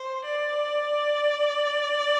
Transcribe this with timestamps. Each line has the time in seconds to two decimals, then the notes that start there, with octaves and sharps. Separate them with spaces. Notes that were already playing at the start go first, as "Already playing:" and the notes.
Already playing: C5
0.25 D5